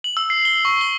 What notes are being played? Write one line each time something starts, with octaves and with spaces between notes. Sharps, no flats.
F#7
E6
C7
G7
C#6
G7